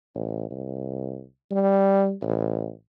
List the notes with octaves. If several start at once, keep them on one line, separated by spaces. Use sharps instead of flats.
A1
C2
G3
A1